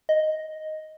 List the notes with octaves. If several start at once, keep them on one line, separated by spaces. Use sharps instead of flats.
D#5